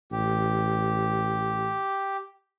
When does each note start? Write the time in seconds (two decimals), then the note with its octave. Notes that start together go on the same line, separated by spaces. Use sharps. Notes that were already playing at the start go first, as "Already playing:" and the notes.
0.12 A1 G4